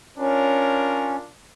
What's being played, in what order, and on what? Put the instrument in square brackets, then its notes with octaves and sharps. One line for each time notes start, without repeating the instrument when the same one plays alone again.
[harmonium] C#4 [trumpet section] D4 F4 A#4